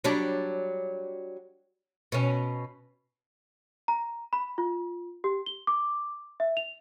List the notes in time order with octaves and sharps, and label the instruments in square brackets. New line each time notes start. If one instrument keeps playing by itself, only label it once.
[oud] F#3 G3 D4
B2 C#4
[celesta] A#5
B5
F4
G4
G7
D6
E5
F7